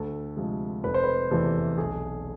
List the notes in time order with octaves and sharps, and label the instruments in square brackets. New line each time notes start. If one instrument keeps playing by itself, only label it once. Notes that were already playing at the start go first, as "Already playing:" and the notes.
Already playing: [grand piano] D2 A4
C3 F3 G#3
F1 B4
C5
B4
E2 C3 E3 A3 A4
B1 G#4